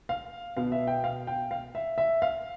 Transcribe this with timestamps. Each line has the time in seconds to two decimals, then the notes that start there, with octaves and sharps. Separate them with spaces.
0.09 F5
0.57 B2 F5
0.72 E5
0.87 G5
1.04 F5
1.27 G5
1.51 F5
1.75 E5
1.98 E5
2.22 F5